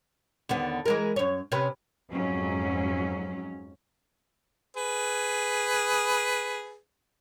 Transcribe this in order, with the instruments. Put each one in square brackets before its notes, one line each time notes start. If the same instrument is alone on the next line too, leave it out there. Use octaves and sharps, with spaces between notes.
[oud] D#2 D3 B3
E3 G#3 A#4
F#2 C#5
C3 C#4 B4
[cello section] F2 G#2 F#3 C#4
[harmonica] G#4 B4